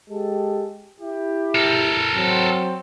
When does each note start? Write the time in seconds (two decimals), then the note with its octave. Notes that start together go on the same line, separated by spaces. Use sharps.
0.10 G#3 G4 A4
1.01 E4 G4
1.55 A4 A#4
2.14 F#3 C4